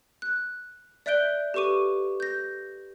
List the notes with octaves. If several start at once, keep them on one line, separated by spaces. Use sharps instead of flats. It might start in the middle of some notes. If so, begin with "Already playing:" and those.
F#6
D5 E5 F#6 G6 D7 G7
G4 A4 B4 C#6 D6 D#7
G6 A#6